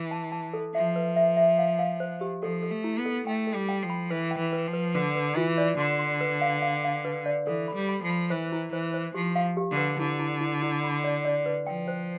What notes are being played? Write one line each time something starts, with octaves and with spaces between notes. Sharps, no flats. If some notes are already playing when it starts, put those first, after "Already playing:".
Already playing: E3
A5
A5
A4
F3 E5
B4
E5
E5
F5
F5
C5
G4
F3 A4
A4
A3
E4
B3
A4
A3 G5
A4
G3
G5
F3
B5
E3 B4
G5
E3
B4
F3
B4
D3 B4
B4
E3 F4
D5
D3 C6
C6
B4
F5
F5
F5
B4
D5
E3 A4
B5
G3
B5
F3
B5
E3 C5
E4
E3 C5
C5
F3 G4
F5
G4
D3
B4
D3 E4
E4
E4
E4
B5
D5
D5
B4
F3 G5
C5